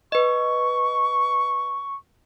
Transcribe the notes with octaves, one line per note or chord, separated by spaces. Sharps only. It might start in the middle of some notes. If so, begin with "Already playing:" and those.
B4 D#5 C#6